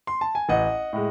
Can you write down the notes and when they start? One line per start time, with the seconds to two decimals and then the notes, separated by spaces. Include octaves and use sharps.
0.07 C6
0.21 A5
0.35 G#5
0.49 A1 D#5 F#5
0.93 A2 G#3